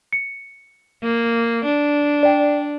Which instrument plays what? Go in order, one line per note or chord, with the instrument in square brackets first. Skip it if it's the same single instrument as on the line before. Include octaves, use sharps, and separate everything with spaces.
[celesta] C#7
[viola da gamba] A#3
D4
[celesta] D5 G5